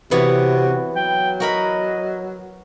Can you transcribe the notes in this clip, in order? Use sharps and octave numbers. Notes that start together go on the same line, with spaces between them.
C3 E3 B3 F#4 C#5
F#3 G5
F#4 A#4 D#5 B5